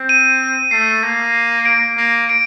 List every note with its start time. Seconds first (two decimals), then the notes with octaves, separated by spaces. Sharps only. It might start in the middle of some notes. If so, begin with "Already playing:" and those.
Already playing: C4
0.09 D#7
0.71 A3 C7
1.03 A#3
1.65 D7
1.97 A#3
2.29 D7